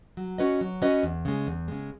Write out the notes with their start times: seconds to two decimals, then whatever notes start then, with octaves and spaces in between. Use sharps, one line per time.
0.17 F#3
0.38 C#4 F#4 B4 D#5
0.61 F#3
0.82 C#4 F#4 B4 D#5
1.03 E2
1.25 C#3 G#3
1.47 E2
1.68 C#3 G#3